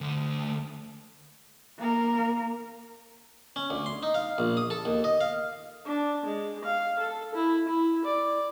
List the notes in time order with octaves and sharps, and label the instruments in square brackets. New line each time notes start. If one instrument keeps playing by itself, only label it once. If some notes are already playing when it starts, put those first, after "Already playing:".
[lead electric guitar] D2 A3
[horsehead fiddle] A#3 A#4
[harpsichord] C#4
D2
C6
D#4
F5
A#1
D#6
A4
D#2
D#5
F5
[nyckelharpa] D4
G#3
F5
A4
E4
E4
D5